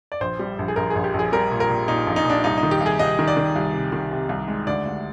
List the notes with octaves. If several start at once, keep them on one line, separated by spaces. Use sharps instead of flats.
D5
A#1 C5
G3
A#1
G#4
A#1 A#4
A#1 G#4
G4
A#1
G#4
G3 A#4
A#2
A#4
A#2
A#2 D#4
A#1
D#4
A#2 D4
C2 D#4
D#4
D#3
G4
C2
G#4
C2 D#5
D#3
D5
D#3
C2
C3
D#3
C3
C2
G#3
D2 D5
D2